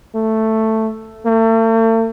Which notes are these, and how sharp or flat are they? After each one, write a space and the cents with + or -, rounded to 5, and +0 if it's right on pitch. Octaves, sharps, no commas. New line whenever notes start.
A3 +5
A3 +40